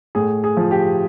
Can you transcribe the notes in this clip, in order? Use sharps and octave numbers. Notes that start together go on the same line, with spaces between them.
A2 G#4
G#4
F3
G4